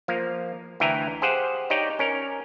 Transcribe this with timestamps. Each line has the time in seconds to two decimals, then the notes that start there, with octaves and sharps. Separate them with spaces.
0.08 F3 A#3 F5
0.80 D2 E3 E4 G5 G#5 A#5
1.22 G4 G#4 C5 F5 F#5
1.70 D#4 G4 C#5 D5 G5
1.99 C#4 A#4